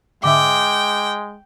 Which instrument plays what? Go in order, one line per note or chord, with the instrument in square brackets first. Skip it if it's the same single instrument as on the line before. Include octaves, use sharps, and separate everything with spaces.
[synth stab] G#2 D3 E5 [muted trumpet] G#3 [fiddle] G5 [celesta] D6